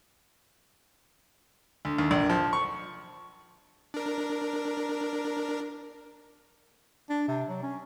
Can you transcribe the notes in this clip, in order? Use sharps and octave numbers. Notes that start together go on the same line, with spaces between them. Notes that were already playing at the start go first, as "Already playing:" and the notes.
D2
D#2
A#1
F3
C#6
D4 A#4
D4
C3
F#3
C#4